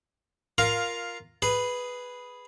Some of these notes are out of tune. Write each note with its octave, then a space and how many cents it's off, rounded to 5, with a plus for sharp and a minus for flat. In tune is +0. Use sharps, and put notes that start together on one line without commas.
F4 +0 A#4 +0 F5 +10
G#4 +0 B4 +0